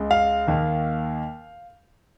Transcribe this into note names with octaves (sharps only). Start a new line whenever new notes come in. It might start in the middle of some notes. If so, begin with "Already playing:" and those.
Already playing: C#2 C#3 G#3
F5
D#2 D#3 A#3